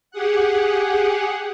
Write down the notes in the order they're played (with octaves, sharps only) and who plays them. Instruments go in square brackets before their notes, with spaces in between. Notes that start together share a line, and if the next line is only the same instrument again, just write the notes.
[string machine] G4 G#4 F#5